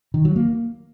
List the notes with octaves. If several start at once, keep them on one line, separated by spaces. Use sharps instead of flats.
D#3
F#3
A#3